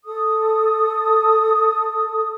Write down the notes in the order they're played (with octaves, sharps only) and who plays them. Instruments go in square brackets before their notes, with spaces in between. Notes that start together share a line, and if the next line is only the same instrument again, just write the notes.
[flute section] A4 D#6